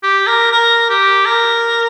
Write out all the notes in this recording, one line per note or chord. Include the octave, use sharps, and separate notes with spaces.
G4
A#4
A#4
G4
A#4